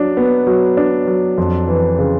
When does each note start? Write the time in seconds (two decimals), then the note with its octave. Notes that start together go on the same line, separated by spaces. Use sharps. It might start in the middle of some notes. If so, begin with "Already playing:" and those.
Already playing: F#3 D4
0.17 B3
0.47 F#3
0.77 D4
1.07 F#3
1.38 F2
1.68 E3
1.99 C#3